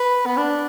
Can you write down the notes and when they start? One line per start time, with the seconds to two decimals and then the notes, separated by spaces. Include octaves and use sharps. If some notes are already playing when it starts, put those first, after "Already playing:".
Already playing: B4
0.26 B3
0.37 D4